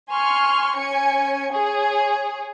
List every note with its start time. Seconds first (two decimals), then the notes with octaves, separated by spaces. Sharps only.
0.11 G#5 C6 C#6 F6
0.78 C#4 G#5 C#7
1.52 G#4 C#5